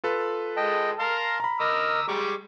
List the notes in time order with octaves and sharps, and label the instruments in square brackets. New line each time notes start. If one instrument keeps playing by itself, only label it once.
[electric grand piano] F4 A4 B4
[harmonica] G#3 A5 [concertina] D#5 G5
[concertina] F5 A5 C6 [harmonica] A#5 F6
[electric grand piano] A#5 B5
[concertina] A#4 D#5 [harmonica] D6 E6 F6
[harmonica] G3 G#3 [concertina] C#6 D6